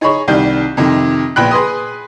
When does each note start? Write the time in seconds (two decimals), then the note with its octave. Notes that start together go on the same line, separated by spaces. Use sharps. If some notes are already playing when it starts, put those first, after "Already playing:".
0.01 D#4 G#4 C#5 D#5 B5 C#6
0.28 C2 D#3 G3 G6
0.77 F2 C3 D#3
1.36 A#1 A#2 B3 G5 B5 F#6
1.51 G#4 B4 C6 D#6